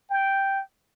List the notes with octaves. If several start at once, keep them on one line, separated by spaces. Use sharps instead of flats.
G5